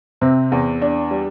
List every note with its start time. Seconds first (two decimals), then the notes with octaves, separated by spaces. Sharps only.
0.21 C3 C4
0.52 E2
0.82 D4
1.11 G3